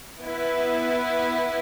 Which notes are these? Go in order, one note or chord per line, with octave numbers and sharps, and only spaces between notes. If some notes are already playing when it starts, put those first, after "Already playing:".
B3 E4 B4